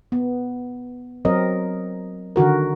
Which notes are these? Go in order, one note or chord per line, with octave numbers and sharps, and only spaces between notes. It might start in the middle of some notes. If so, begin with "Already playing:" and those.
B3
F#3 C4 A#4 D#5
D3 D#3 F#4 A#4